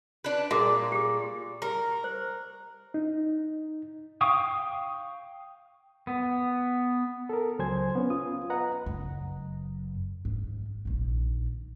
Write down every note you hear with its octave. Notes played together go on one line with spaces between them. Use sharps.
D4 B4
A#2 F#4 G#4 D6
G4 G#4
G4 A#4
C5
D#4
F5 G5 C#6 D#6
B3
A4 A#4
C#2 F#3 C5 G#5 G#6
B3 C#4
F4 D#6
B4 D#5 F#5 A#5
F#1 F#2
G#2
A#1 D#3